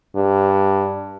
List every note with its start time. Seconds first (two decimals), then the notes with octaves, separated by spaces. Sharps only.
0.16 G2